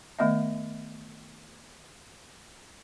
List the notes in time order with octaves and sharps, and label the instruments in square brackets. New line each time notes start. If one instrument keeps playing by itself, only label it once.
[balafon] D#3 A3 B3 D#5 E5